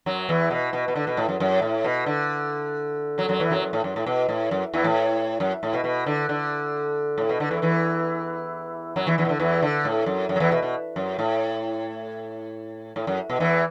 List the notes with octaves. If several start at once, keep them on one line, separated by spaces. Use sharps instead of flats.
F#2 F#3
E2 E3
B2
B2
B2
D3
B2
A2
F#2
F#2
A2
B2
D3
F#2 F#3
F#2 F#3
E2 E3
F#2 F#3
F#2
A2
F#2
A2
B2
A2
F#2
E2 E3
A2
F#2
A2
B2
B2
D3
D3
A2
B2
D3
E2 E3
E2 E3
F#2 F#3
E2 E3
E2 E3
B2
D3
E2 E3
D3
A2
F#2
F#2
F#3
E2 E3
B2
B2
F#2
A2
A2
F#2
B2
E2 E3